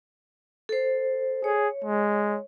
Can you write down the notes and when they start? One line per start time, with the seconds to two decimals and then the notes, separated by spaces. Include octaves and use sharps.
0.69 A4 C5
1.44 G#4 C#5
1.84 G#3